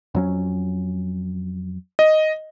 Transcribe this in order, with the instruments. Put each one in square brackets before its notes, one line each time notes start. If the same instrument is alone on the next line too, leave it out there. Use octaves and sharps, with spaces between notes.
[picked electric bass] F2 F#3 C#4
[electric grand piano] D#5